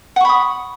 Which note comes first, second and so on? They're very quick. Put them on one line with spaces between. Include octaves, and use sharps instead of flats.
F#5 C#6 B5 D#6